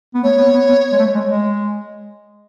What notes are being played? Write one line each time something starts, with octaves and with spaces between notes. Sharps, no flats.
B3
A3 C#5
B3
B3
B3
G#3
A3
G#3
G#3